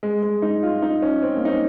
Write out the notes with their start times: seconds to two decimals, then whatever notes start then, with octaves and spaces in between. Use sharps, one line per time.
0.03 G#3
0.23 G#3
0.42 D#4
0.63 F4
0.82 D#4
1.02 C#4
1.22 C4
1.36 A#3
1.45 D#4
1.49 C#4